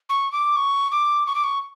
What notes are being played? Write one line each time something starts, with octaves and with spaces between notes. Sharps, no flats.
C#6
D6
C#6
D6
C#6
D6
C#6